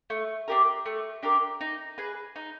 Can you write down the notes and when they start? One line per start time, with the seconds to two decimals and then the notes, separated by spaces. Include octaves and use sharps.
0.10 A3
0.48 D4 G4 A#4
0.86 A3
1.23 D4 G4 A#4
1.61 D#4
1.98 G#4 B4
2.36 D#4